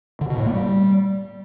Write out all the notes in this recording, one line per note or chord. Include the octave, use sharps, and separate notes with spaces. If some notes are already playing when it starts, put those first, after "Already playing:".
D3
B2
A2
A#3
G3